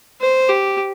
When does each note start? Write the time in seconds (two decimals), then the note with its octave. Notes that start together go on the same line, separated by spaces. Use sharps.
0.21 C5
0.49 G4